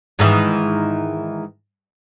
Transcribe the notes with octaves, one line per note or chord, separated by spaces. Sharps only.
G#2 D#3 E3